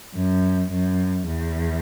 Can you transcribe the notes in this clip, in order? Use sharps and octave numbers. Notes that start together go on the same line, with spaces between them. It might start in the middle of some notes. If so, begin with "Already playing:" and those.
F#2
F#2
E2